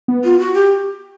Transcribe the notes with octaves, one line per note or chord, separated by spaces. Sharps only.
B3
F4
F#4
G4